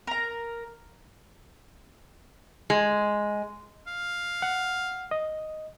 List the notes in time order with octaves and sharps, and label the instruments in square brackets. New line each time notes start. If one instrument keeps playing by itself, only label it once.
[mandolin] A#4 A#5
[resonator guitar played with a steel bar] G#3
[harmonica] F5
[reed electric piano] F#5
D#5